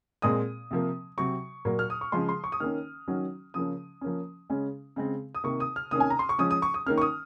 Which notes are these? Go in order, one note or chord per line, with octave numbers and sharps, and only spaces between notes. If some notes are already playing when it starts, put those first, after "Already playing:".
A#2 G#3 C4 D#6
C3 F3 A#3
C3 F#3 C4 C#6
A#2 F#3 A#3
F6
D#6
C#6
C#3 F3 G#3 C6
C6
C#6
D#6
D#3 A#3 C#4 F6
D#3 F#3 C#4
C#3 F3 A#3 C#4 D#6
F3 A#3 C#4
C#3 G#3 C#4
C#3 G#3 C4
D#6
C3 D#3 A#3 C#6
D#6
F6
C3 D#3 A#3 C#4 D#6
G#5
A#5
C6
C#6
F3 G#3 C#4 D#6
D#6
C#6
D#6
D#3 A#3 C#4 F6
C#6
D#6